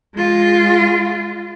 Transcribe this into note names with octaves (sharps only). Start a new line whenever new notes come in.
G#3 F4